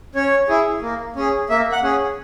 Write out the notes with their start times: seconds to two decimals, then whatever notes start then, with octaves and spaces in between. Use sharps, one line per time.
0.15 C#4 C#5
0.48 E4 G#4
0.82 A#3
1.16 C#4 G#4
1.50 A#3 E5
1.72 F#5
1.83 C#4 G#4